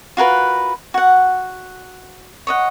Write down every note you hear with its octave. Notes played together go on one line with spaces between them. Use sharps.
F4 F#4 A#4 B4
F#4 F#5
C#5 D#5 F#5